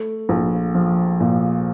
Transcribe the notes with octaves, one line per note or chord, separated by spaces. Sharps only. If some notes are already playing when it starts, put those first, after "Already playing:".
Already playing: A3
A#1
F3
A#2